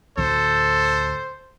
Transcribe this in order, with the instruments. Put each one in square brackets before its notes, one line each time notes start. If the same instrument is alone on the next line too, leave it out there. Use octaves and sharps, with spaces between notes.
[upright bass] D2 A2 [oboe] A4 [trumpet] C5